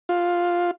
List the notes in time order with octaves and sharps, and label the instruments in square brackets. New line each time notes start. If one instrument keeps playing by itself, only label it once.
[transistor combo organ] F4